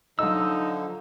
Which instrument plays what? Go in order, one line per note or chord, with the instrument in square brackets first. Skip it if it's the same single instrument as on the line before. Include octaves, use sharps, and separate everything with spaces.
[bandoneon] D3 F3 [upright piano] F#3 D#5 [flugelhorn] D#4 [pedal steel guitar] E6